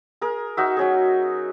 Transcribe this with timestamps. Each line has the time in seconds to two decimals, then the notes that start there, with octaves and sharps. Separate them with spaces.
0.21 G#4 A#4
0.57 D#4 F#4 E5
0.77 F#3 C#4 G#4